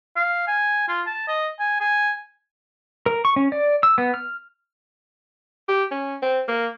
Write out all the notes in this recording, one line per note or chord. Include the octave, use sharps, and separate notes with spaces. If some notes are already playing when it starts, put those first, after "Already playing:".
F5
G#5
F4
A5
D#5
G#5
G#5
A#4
C#6
C#4
D5
E6
B3
F6
G4
C#4
C4
A#3